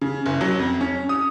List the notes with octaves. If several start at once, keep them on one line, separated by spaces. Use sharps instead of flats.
C#3
F#1
F#3
F2
C#4
D#6